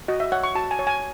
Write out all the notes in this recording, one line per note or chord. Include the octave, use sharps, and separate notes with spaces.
F#4 D#5
E5
C#5 F#5
C#6
F#4 A5
G#5
C#5
G#5